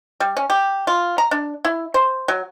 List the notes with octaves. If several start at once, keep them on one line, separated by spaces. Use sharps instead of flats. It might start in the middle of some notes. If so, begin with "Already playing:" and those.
G3
C#4
G4
F4
A#5
D4
E4
C5
F#3